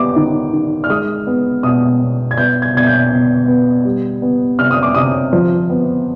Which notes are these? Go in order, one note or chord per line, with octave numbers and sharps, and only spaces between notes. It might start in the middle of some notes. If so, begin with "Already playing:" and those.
Already playing: G3 B3 D6
D#3
D#3
F6
G#3 D#6
B3
B2 D#6
B2
G#6
B3 G6
G#6
B2 G#6
G6
B2
B3
G3
B3
C3 F6
D#6
D6
C3 D#6
F3
B3